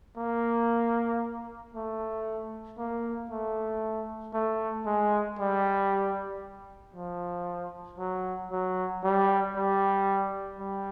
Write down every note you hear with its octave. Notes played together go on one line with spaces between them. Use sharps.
A#3
A3
A#3
A3
A3
G#3
G3
F3
F#3
F#3
G3
G3
G3